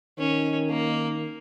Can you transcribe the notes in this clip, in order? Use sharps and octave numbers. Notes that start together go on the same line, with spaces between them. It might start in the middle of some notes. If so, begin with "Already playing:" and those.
D#3 C#4
A#3